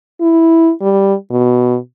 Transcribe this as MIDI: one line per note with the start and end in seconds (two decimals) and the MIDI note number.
0.21 0.71 64
0.81 1.14 55
1.31 1.77 47